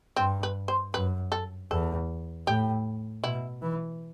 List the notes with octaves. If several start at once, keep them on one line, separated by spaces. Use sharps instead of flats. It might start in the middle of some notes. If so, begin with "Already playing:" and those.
G2 C4
B4
C5
F#2 B4
A4
E2 A4
A2 G4
B2 E4
E3